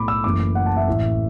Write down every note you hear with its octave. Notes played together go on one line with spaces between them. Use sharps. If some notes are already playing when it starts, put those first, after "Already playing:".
Already playing: B1 A2 A3 B5 D6
E6
F#1 F#2 E3 A3 D6
F#5
A5
E5
A1 A2 E3